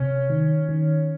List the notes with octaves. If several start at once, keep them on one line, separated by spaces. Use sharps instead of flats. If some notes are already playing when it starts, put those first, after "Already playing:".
Already playing: C3 C#4
D#3
D#3